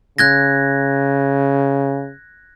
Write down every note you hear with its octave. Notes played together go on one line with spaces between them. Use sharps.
C#3 F#6 G#6 A#6